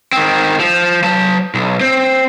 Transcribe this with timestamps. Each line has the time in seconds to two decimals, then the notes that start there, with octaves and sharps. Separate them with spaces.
0.13 D#3 C4
0.60 F3
1.04 F#3 A5
1.55 B1
1.80 C4